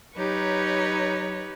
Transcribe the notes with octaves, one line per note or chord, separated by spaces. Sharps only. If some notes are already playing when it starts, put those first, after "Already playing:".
F#3 D#4 G4 B4 C#5